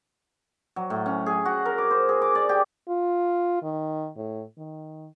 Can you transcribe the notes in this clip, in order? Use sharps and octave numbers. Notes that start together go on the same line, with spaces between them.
F#3
A2
C#4
G#4
F#4
A#4
D6
C5
G#4
D6
D5
G4
F4
D#3
A2
D#3